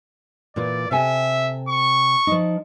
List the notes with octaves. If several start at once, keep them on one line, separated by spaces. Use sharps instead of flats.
A#2 E3 F4 D5
C3 A4 E5 G#5
C#6
F3 D#4